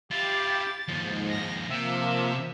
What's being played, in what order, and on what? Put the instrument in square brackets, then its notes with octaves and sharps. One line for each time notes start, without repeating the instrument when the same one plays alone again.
[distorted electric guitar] E4 F4 [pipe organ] G4 [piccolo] A6
[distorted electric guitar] D#2 F3 [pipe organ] G#2
[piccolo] A#6
[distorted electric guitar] C3 [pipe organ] F3 A#3 [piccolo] E5